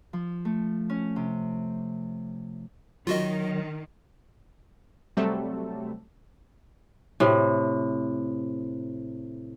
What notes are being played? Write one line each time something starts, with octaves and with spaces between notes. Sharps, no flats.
F3
A3
C#4
C3
D#3 F#3 F4 F#4 D#5
C3 F#3 G3 A3 C4 A4
A2 C3